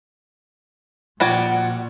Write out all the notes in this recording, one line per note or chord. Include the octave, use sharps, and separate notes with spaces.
A#2 F3 G3 F#4 D5 F#5 G#6